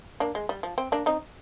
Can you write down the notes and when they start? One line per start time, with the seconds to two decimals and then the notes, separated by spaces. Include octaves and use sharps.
0.20 A#3 D4
0.35 G#3
0.49 G3
0.63 F3
0.78 C4
0.92 A#3 D4
1.06 C4 D#4